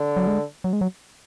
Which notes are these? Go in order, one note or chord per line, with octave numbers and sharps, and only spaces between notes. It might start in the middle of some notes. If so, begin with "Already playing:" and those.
Already playing: D3
F#3
G#3
F#3
G#3
F#3